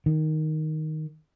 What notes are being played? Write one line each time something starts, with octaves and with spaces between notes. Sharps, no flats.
D#3